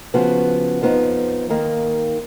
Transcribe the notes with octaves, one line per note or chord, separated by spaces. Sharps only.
C#3 F3 B3 F#4
F2 F3 B3 D#4
D#2 D#3 A#3